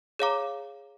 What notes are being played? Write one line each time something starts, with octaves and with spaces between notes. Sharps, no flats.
G#4 C#5 F5 A#5 D6